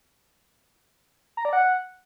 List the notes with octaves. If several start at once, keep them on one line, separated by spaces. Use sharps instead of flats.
A#5
D5
F#5